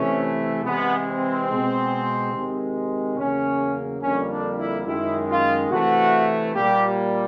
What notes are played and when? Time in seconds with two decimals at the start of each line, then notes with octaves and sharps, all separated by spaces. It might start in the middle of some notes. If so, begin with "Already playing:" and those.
Already playing: C3 E3 A3 C#4
0.64 C3 E3 G#3 B3
1.07 C4
1.49 B2 G#3
2.33 C3 D#3 G#3
3.18 E2 C#3 F#3 A#3 C#4
4.02 F2 D3 G3 A#3 C#4
4.30 D4
4.58 E4
4.86 F#2 D#3 G#3 E4
5.29 F4
5.70 C3 E3 A3 F#4
6.54 A#2 G3 A#3 G4